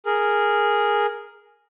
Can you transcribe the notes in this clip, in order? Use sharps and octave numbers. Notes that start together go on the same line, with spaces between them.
G#4 A#4